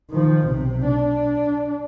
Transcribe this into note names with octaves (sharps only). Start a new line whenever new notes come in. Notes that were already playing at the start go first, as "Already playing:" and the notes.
D#3 F3
B1 C3
D4